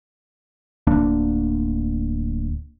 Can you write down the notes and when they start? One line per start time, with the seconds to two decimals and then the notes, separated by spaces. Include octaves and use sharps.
0.87 D1 D2 A#3 D4